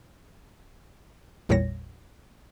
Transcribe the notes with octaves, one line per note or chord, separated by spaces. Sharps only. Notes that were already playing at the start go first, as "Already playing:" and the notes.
A1 E2 A#2 G3 C#5 A#6